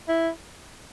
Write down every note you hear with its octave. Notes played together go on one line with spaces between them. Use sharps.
E4